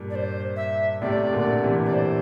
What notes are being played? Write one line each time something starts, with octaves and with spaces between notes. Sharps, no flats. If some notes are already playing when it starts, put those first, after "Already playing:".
Already playing: G2 A#2
D5
C5
E5
A2 C3 D5
A#2 D3
C3 E3
D5
C5